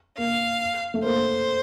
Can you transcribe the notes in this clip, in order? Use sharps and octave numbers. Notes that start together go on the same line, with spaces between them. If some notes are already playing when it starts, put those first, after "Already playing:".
A#3 F5
A3
A#3 C5